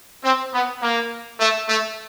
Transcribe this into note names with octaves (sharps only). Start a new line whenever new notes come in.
C4
B3
A#3
A3
A3